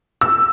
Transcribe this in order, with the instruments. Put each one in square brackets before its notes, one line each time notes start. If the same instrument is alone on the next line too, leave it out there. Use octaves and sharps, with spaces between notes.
[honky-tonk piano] E6